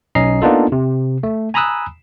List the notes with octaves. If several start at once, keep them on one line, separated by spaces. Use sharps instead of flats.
B1 C#4 D#5 A#5 C7
A#3 B3 D4 D#4 F4 A4
C3
A3
G#5 A#5 B5 D#6 E6 F#6